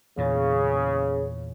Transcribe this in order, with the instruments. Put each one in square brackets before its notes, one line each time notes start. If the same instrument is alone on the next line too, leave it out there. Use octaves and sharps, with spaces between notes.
[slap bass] E2 A#2 [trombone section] C#3